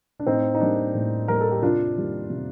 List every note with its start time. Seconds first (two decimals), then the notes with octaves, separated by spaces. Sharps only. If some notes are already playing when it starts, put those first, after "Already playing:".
0.20 D4
0.26 A2 C4 D#4
0.55 D#4
0.60 G3 A#3 D4
0.94 A2
1.28 G3 A#3 A#4
1.41 A4
1.51 G4
1.62 C3 D4 F4
1.96 D#3 G3 A#3
2.30 C3